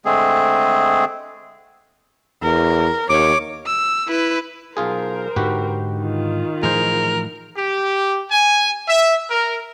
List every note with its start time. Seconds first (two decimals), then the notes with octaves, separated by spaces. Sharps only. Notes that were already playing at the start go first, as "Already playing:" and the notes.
0.05 D3 G#3 A3 C4 G#4
2.42 E2 A#4
3.09 D#2 C#5 D6
3.66 E6
4.08 E4 B4
4.77 B1 F4 G#4 A#4 C5
5.36 G#2 D3 D#4 F#4 G4 B4
6.01 D#3 F4
6.63 A2 E3 F3 G#4 A#4 C5
7.56 G4
8.31 G#5
8.87 E5
9.30 A#4